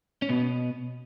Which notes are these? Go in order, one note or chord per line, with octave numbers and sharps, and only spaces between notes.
C#4
B2 B3